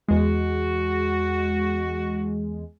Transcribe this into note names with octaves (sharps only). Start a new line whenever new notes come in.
E2 G#3 F#4